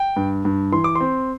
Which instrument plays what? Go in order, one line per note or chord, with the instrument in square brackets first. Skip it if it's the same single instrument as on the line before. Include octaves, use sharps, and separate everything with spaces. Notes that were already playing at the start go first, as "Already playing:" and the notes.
Already playing: [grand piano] G5
G2
G2
E3 C6
D6
C6
C4